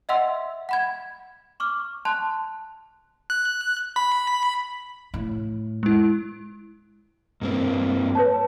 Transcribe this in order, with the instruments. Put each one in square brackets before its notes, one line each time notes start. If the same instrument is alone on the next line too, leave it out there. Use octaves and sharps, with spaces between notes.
[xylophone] D#5 E5 F#5 C6 E6
F#5 B5 G#6
C#6 D6 F6
A5 C6 F#6
[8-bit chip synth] F#6
B5
[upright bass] A2
[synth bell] G#3 E4
[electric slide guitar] G2 A#3 C4
[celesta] B4 C#5 A5